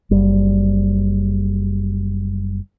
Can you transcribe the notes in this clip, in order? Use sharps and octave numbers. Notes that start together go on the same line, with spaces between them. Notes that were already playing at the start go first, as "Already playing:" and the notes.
F#1 G3